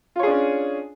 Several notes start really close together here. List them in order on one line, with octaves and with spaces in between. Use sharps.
F4 C#5 G#4 D4 C#4